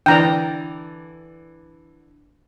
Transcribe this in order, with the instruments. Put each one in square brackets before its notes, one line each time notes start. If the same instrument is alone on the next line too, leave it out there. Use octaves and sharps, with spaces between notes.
[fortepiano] D3 E3 D5 [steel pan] G5 A#5